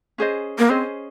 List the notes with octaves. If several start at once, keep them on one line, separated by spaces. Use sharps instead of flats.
C#4 G#4 C5 D#5
A#3
C4 C#4 G#4 C5 D#5